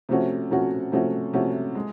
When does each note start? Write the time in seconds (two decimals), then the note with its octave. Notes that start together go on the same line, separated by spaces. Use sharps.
0.09 C3 F3 A3 C#4 F#4
0.50 C3 F3 A3 C#4 F#4
0.92 C3 F3 A3 C#4 F#4
1.33 C3 F3 A3 C#4 F#4
1.75 G#3